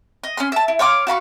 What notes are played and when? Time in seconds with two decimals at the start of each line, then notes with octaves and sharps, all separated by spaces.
0.24 D#5
0.37 C#4 B5 C6
0.52 E5 A5
0.68 E4
0.79 C#5 F5 C6 D6
1.07 F#4 F5 B5 C#6